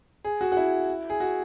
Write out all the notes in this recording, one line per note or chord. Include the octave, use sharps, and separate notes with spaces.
G#4
F#4
F#4
E4
G#4
F#4